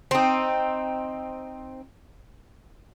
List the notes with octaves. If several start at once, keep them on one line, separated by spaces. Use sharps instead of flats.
C4 D#4